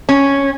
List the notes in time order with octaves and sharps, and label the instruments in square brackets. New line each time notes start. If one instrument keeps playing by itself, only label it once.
[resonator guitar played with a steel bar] C#4